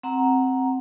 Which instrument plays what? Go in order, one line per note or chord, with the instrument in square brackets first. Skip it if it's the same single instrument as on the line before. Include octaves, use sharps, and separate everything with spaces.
[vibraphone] C4 F#5 A#5